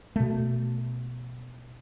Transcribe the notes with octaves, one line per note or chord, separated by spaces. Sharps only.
B2 A3